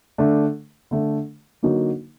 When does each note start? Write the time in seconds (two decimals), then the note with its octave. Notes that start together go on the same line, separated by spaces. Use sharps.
0.18 D3 A3 D4
0.91 D3 A3 D4
1.63 D3 F#3 A#3 D#4 F#4